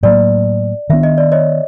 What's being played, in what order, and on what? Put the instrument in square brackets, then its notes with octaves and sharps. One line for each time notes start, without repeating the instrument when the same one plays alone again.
[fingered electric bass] A2 F#3 A#3 [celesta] D5
[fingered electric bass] D#3 F#3 B3 D4 [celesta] E5
[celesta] D#5
D5
C#5 D#5